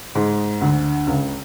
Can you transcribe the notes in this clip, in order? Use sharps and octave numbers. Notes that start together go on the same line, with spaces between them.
G#2 G#3
D2 D3
C#2 C#3